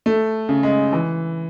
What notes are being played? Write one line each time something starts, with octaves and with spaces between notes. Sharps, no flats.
A3
C#3
G#3
E3